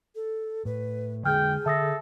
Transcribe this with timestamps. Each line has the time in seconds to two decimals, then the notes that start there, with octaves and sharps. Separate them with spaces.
0.15 A4
0.65 A2 B4
1.25 D3 G#3 G#4 G5 F6 G6
1.66 D3 A4 E5 D#6 A#6